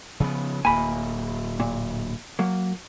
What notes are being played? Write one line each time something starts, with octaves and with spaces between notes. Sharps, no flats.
C#3 F3 B3
D1 A#3 G#5 B5
A#2
F#3 A#3